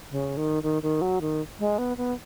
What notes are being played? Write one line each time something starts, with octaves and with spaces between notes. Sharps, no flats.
C#3
D#3
D#3
D#3
F#3
D#3
G#3
B3
B3